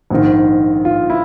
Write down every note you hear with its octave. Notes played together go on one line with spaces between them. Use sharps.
A#1 G#2 D#3
F4
E4